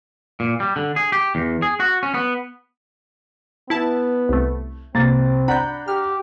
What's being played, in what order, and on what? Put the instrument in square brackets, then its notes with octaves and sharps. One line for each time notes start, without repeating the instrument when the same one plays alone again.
[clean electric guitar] A#2
G3
D3
G#4
G4
E2
G#4
F#4
C#4
B3
[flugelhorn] B3 [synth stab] E4 A5
[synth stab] C2 A3
[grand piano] C2 A6 [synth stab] A#3 [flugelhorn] C4
[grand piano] D4 F#5 A#5 [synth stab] B5 G6
[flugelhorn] G4 [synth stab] F6